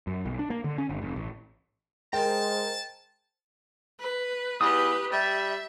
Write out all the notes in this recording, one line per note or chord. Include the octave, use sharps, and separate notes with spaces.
F#2
B1
D4
A#3
D3
C#4
G1
F1
A1
G#3 A#4 C5 G5 A5
B4
E2 G4 B4 D#6
G3 E5